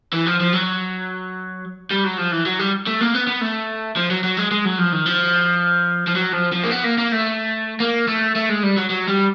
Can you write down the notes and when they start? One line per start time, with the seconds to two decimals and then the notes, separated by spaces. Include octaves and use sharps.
0.13 E3
0.26 F3
0.40 F3
0.53 F#3
1.91 G3
2.04 F#3
2.17 F3
2.31 E3
2.46 F#3
2.59 G3
2.86 A3
3.00 A#3
3.14 B3
3.27 B3
3.41 A3
3.96 F3
4.10 F#3
4.23 F#3
4.37 G#3
4.51 G#3
4.65 F#3
4.79 F3
4.92 D#3
5.06 F3
6.07 F3
6.15 F#3
6.33 F3
6.52 F3
6.63 A#3
6.71 B3
6.84 A#3
6.98 A#3
7.12 A3
7.80 A#3
8.08 A3
8.35 A3
8.49 G#3
8.63 G3
8.76 F#3
8.90 F#3
9.08 G3